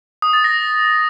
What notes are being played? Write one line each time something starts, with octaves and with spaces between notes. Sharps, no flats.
D#6
A6
A#6